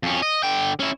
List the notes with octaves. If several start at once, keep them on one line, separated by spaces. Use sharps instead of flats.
F2 C#4
D#5
D3 G5
C#4 E4